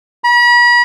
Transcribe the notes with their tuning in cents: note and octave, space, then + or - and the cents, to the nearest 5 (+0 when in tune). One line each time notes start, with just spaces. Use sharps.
B5 -40